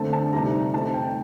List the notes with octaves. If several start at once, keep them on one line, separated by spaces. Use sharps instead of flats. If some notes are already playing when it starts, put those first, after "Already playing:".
Already playing: D3 A3 C4 A5
A5
C3 D#3 G3 A#5
D#3 A3 C4 D#4 A5
G5